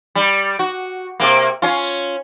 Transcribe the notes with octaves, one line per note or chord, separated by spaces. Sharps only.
G3
F#4
C3 A#3
C#4 F4